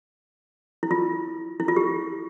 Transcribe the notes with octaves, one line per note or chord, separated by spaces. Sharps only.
E4
F4
E4
F4
G4